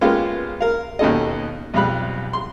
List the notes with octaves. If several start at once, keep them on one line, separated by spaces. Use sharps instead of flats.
G#3 A#3 B3 C#4 F4 G4
A#4 F5
D#2 B2 C#4 A4 D#5
B1 F2 G3 F5 B5 F#6
C6